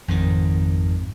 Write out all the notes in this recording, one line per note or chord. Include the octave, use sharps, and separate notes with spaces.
G#1 F2 D#3